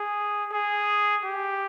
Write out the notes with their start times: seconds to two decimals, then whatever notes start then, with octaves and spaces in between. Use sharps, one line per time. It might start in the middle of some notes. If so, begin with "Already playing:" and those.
Already playing: G#4
0.53 G#4
1.24 G4